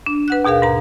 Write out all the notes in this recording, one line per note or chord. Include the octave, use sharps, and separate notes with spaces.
D4
B4 F#5 F#6
D#2 B2 G#4 A#4 F5
G#2 A#5